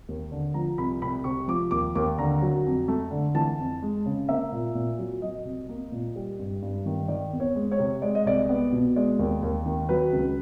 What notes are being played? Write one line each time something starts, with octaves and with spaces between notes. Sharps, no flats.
D#2
D3
F3 A#5
C2 B5
C2 B5
C3 C#6
F3 D6
D#2 D6
D#2 D6
D3 A#5
F#3
F2
A3
D3
E3 A5
F2
G#3
C#3
A#3 E5
A#2
A#2
F#3
F#3 D#5
C2
A#3
A#2
G3
G2
G2
D#3
D#3 D5
E2
C#5
G#3
C#5
C3
G#3 D5
D#5
C2 D5
B3
B2
G#3 D5
D#2
D#2
D#3
F#3 B4
C#2